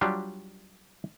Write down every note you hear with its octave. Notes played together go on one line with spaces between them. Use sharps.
F#3 G3 D4 F4 G4